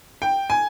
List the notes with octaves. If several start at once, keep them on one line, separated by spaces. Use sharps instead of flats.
G5
G#5